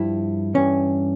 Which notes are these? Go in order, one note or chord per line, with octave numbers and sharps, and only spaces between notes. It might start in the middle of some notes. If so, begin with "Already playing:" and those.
Already playing: G2 F3 E4
G2 E3 C#4